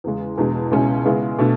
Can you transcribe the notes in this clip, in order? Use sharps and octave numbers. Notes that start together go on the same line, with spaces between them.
E2 C#3 G#3
E2 B2 G#3 D4
C#2 B2 G#3 C#4 E4
C#3 G#3 B3 E4
B2 A3 D4